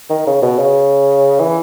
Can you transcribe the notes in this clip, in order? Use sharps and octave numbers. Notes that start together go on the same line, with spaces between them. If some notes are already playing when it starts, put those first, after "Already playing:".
D#3
C#3
B2
C#3
E3